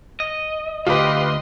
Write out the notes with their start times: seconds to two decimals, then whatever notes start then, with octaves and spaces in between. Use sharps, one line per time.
0.20 D#5
0.87 D2 F4 G4 B4 D#5 C6